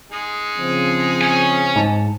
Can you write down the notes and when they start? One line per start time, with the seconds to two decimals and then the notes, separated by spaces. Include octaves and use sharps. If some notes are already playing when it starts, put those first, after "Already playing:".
0.12 G#3 D#4 G#4
0.58 C#3 F3 C4
1.21 C#5 G#5
1.76 G#2 A5